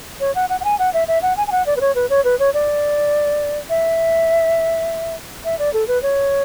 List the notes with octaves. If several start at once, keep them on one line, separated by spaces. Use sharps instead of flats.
C#5
F#5
F#5
F#5
G#5
F#5
E5
E5
F#5
G#5
G#5
F#5
D5
B4
C#5
B4
C#5
B4
C#5
D5
E5
E5
D5
A4
B4
C#5